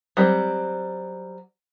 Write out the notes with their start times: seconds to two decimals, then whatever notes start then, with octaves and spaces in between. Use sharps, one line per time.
0.17 F#3 G3 C4